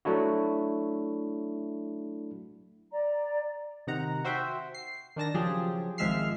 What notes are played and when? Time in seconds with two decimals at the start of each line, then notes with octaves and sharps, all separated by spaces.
0.05 F#3 A3 D4 E4 F#4
2.92 D5 A#5
3.87 C3 D#3 F#5 A#5
4.24 F#4 C5 E5 G5
4.74 C7
5.16 D#3 D4 A5 A#6
5.34 C#3 F3 F#3 F4 G4 G#4
5.98 G#1 F3 G#3 E5 F6 C7